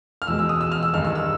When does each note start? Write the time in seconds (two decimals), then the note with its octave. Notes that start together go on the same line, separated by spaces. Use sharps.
0.22 F6
0.27 E2 B2 G#3 E6
0.39 E6
0.49 D#6
0.61 E6
0.72 F6
0.83 E6
0.94 G2 D#3 G#3 F6
1.05 E6
1.15 E6